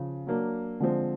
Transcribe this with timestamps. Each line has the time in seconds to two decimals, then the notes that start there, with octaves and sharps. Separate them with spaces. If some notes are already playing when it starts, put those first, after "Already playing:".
Already playing: C#3 F3
0.27 F#3 A#3 D4
0.80 D3 F3 G#3 C4